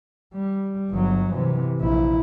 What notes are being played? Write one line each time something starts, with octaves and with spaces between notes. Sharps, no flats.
G3
G1 F#3
C3 E3
A#1 E4